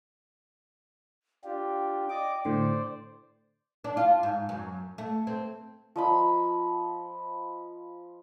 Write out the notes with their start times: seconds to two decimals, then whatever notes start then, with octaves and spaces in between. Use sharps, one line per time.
1.44 D4 F4 G4 G5
2.10 D5 D#5 D6
2.45 A2 D3 C5 D5
3.84 D4
3.97 F4
4.23 G#2
4.49 F#2
4.98 A3
5.27 C4
5.96 F3 D#5 B5